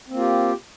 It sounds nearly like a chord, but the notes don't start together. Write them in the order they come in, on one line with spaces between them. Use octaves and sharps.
C4 A#3 F4 G4